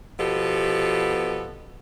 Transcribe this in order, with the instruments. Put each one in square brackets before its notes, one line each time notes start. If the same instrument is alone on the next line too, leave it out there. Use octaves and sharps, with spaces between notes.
[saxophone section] B2 F3 B3 G4 A4